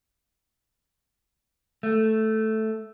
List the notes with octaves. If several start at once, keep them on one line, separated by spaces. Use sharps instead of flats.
A3